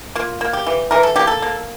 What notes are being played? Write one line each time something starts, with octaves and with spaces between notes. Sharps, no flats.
A#3 F4
A#3
G4
E3
E3 A#4
A4
A#3 G4
A4
A#3